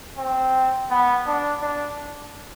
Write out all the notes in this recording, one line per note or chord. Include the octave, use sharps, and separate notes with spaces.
C4
B3
D4
D4